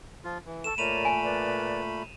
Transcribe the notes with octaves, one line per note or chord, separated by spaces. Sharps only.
F3 F4
E3
A4 C#6 E7
A#2 A3 A#4 C#5 D5 B5 D#7 F7
G#5
A#4 B4 D5